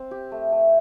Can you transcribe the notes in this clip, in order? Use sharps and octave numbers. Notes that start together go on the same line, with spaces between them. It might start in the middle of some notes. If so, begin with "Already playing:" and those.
Already playing: C4 C5
G4
A3
A3